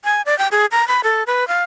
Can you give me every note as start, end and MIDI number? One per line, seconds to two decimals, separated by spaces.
0.04 0.22 80
0.26 0.37 74
0.38 0.48 79
0.52 0.66 68
0.72 0.87 82
0.88 1.01 83
1.04 1.23 69
1.27 1.47 71
1.48 1.64 77